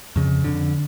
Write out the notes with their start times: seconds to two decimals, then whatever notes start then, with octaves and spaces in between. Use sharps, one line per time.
0.16 F2 C#3
0.44 F2 D3